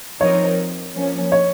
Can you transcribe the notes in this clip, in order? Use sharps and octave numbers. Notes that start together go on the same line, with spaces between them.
F3 C4 D#4 A#4 C#5
F3 A#3 C#4
C#5